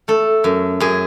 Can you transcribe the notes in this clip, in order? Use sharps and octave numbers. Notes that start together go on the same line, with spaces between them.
A3 A4
F#2
F#2 G#4